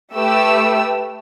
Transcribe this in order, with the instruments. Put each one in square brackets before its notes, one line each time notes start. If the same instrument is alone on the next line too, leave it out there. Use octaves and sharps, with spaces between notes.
[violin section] A3 G4 B4 E6